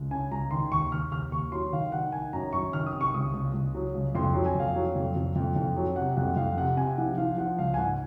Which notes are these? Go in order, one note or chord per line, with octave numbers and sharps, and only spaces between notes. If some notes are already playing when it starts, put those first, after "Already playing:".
Already playing: C#2
C#3 G#5
C#2 A#5
D#3 C6
D#2 C#6
D#2 F6
D#2 F6
D#2 C#6
F#3 C6
D#3 F5
D#3 F#5
D#3 G#5
F#2 A#5
F#2 C#6
D#3 F6
D#6
C3
C#6
C#2 D#6
C#2
C#2
F#3
C#2
F2 C6
F#3
G#5
F2 F5
F#3
F2
F2
F2
F2
F#3
C3 F#5
F2 F#5
F2 F5
C3 F#5
C3 G#5
F3 F#5
F3 F5
F3 F#5
C#2 F5
G#5
G#2 F#5